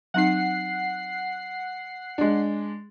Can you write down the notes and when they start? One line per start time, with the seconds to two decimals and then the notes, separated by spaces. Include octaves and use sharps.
0.14 F#3 C4 D#4 F#5 C7
2.18 G#3 D4